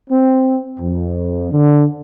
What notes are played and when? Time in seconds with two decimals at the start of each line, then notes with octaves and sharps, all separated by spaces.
0.10 C4
0.79 F2
1.52 D3